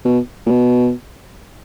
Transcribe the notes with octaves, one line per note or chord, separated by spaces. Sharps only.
B2
A#2
B2